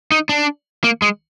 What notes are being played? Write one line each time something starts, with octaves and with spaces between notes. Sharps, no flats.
D#4
D4
A#3
G#3